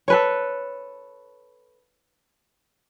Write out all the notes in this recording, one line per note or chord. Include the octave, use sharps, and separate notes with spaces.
A4 B4 C#5